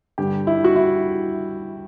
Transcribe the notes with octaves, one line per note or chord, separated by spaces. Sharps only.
G2 D3 G4
E4
F#4
E4